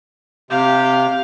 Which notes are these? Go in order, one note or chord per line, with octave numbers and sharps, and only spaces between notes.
C3 G4 F5